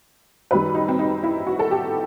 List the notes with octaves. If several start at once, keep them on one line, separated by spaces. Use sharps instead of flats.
F#2 D#3 G3 B4
D#4
C4
D#4
E4
F#4
A4
G4